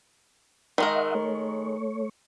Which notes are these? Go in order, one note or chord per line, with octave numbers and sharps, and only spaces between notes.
D#3 G#3 A#4 D#5 E5 F#5
A3 C#5